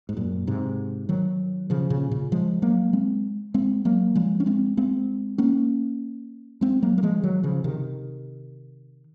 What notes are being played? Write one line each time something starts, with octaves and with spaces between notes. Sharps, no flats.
G#2
F#2 A#2
G#2 C3
D#3 F#3
C#3 F3
A#2 C#3
A#2 C#3
F3 G#3
F#3 A#3
G#3 C4
G#3 C4
F#3 A#3
F3 G#3
C#4
G#3 C4
G#3 C4
A#3 C#4
G#3 C4
F#3 A#3
A#3
F3 G#3
D#3 F#3
C#3 F3
C3 D#3